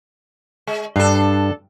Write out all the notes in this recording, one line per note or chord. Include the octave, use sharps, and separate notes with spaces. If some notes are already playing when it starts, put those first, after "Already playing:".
G#3
G2 D4 A4